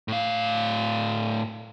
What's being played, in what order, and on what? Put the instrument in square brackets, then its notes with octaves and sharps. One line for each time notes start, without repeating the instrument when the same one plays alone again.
[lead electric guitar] A2 F5